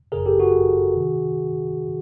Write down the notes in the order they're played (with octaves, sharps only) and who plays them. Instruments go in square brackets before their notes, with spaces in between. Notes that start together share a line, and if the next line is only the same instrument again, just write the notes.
[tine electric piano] G1 F#2 C#3 G#4 A#4
G4 A4
F#4 G#4
C3 D#3